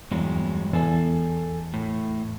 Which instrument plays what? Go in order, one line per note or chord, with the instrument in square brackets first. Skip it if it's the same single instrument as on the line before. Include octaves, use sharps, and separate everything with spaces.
[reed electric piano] E2 [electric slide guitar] G2 F#3 G#3
[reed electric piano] E2 [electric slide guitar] A4 G#5
[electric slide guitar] A2